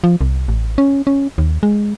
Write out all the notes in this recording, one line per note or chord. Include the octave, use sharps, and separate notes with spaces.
F3
C2
A1
C#4
C#4
D#2
G#3